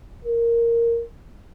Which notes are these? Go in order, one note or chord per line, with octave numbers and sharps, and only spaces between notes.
A#4